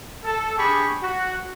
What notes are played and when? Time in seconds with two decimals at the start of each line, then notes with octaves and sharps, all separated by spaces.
0.24 A4
0.58 D4 G4 G#4 B5 C#6
1.03 F#4